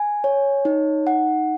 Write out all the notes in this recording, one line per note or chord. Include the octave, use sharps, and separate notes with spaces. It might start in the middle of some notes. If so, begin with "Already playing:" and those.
Already playing: G#5
C#5
D#4
F#5